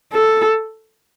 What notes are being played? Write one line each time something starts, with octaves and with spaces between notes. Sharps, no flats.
A4